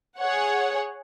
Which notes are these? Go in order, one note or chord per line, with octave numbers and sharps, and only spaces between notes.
G#4 C#5 F#5